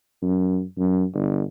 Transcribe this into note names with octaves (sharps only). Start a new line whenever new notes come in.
F#2
F#2
G1